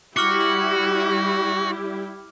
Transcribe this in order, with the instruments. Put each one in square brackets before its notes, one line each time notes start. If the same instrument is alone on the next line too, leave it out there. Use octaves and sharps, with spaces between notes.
[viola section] G3 E4 G4 [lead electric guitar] F#4 [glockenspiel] D6 F6 C#7